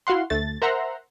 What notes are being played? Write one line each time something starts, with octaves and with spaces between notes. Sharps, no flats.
E4 F#4 F5 F#5 C6
D2 A3 A6
A#4 C5 E5 F#5 A#5 C6